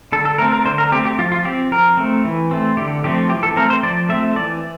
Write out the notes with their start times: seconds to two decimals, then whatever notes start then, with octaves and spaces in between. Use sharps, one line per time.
0.12 D3 A4
0.25 A4
0.38 A3 C4 A#4
0.52 A#4
0.65 D3 C5
0.78 A#4
0.92 C4 G4
0.95 A3
1.05 G4
1.19 F3 F4
1.32 F4
1.45 C4 G4
1.72 F3 A#4
1.97 A3 C4
2.25 E3
2.51 A3 C4
2.77 D3 G4
3.04 F3 A3 C4 G4
3.30 E3 G4
3.43 A4
3.56 A3 C4 A#4
3.70 C5
3.83 F3 D5
4.09 A3 C4 E5
4.36 E3 D5